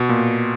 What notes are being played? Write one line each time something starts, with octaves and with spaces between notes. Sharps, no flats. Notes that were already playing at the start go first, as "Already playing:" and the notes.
Already playing: B2
A#2